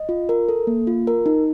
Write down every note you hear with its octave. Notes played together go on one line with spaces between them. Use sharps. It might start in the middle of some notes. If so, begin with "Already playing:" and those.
Already playing: D#5
F4
A#4
A4
A#3
F4
A#4
D#4